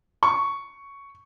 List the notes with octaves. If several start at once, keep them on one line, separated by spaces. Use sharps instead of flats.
C#6